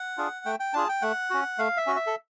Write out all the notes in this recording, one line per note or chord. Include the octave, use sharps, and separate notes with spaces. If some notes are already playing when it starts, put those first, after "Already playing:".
Already playing: F#5
D4 F4 G#4
A3 G5
G5
D4 F4 G#4 A5
G5
A3 F#5
C#4 F#4
A3 F5
E5
C#4 F#4
E5
A4